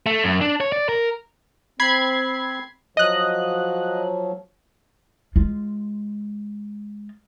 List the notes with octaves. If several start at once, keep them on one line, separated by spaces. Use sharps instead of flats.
A3
F#2
D4
C#5
D5
A#4
C4 B5 G#6 C7
F3 F#3 D#5 F#6
G#3 F4